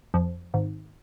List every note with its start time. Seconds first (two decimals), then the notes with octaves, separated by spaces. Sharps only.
0.14 F2
0.54 G#1